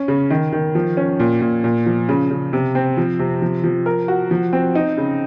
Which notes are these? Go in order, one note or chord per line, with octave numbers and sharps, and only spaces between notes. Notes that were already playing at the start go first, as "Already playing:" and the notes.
Already playing: C#4
C#3
D#3
D#3
F3
C#4
A#2
A#2
A#2
F3
C#3
C#3
C3
C4
F3
C3
F3
F3
A#4
F#4
F3
C4
D#4
C#3